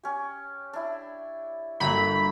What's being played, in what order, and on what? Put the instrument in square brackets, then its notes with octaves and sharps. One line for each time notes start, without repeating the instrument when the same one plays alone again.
[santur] C#4 G4
D4 E4
[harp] G1 D3 A#3 [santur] F#3 G4 A#5 [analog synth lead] B5